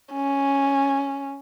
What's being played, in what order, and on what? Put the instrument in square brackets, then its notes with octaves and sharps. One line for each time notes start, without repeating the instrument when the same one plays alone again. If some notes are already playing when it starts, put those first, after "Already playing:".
[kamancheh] C#4